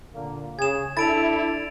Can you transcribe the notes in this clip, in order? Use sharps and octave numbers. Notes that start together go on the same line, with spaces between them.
A#2 D3 A#3
C#3 G#4 G#6 E7
D4 E4 A4 A6 D7 F7